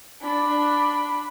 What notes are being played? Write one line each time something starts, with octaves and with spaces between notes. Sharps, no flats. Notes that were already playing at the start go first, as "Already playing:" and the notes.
D4 B5